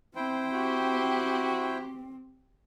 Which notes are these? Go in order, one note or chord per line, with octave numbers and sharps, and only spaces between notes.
C4 E4 C5 G5
F#4 G4